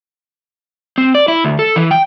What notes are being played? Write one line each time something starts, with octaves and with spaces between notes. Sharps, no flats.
C4
D5
E4
D2
A4
E3
G5